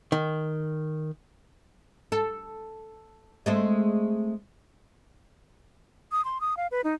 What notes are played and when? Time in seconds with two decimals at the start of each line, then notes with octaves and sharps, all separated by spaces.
0.12 D#3
2.12 A4
3.46 G#3 A3 C4
6.12 D#6
6.25 C6
6.41 D#6
6.57 F5
6.71 B4
6.84 D#4